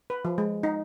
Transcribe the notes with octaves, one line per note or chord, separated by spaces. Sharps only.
B4
F3
G#3
D#4